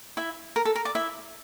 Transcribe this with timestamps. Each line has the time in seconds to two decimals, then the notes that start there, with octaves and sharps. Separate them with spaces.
0.17 E4 E5
0.56 A#4
0.65 A4
0.76 A#4
0.85 D5
0.95 E4 E5